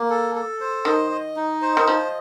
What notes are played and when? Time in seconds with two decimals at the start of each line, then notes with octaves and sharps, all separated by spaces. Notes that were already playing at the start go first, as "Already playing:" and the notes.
Already playing: A#3
0.10 A4
0.35 A4
0.60 C5
0.85 D#3 D#5
1.11 D#5
1.37 D#4
1.62 C5
1.77 D#3
1.87 F3 D#5